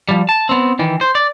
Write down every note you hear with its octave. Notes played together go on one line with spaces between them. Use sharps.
F3 G3
A5
B3 C4
D#3 E3
C5
D5